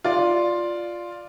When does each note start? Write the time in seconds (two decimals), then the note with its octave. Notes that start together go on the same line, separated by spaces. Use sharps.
0.04 F4 D5